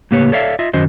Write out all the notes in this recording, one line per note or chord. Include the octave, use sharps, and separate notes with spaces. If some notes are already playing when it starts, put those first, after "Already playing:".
A2 C#3 A#3 G4 B4 C#5
A4 C#5 D5 E5 F5
F4 D#5 E5
F#2 D#3 C#4 F#4 C5 D#5